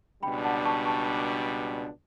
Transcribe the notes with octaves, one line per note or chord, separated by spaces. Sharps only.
C#2 B2 G3 D4 G5 B5
F#5 A5
A5 C#6
A5 C#6